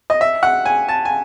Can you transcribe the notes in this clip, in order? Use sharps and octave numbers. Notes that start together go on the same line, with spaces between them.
D#5
E5
F#5
G#5
A5
G#5